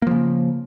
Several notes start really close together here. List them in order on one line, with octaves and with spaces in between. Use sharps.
A#3 F3 C#3